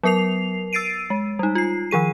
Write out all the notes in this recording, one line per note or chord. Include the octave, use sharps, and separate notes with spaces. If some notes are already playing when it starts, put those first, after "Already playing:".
F#3 B3 A#4 C7 F7
E6 A6 C7 D7 D#7
G#3
G3 D#4
F4 C7
D#3 F3 G#4 D#7